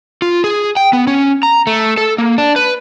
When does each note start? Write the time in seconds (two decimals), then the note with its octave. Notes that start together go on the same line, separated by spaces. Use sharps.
0.22 F4
0.44 G#4
0.77 G5
0.93 B3
1.07 C#4
1.43 A#5
1.67 A3
1.97 A4
2.18 A#3
2.38 D4
2.56 B4